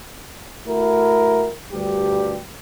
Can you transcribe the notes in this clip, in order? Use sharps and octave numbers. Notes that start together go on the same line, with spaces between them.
A3 E4 F#4 A#4
D2 G2 G3 G4